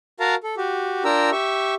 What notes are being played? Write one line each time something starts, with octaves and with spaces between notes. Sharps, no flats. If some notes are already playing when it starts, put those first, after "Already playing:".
F#4 A#4 F5 A5 A#5
A4
F#4 G4
D4 F4 A#4 G5 A#5 E6
G4 E5 C#6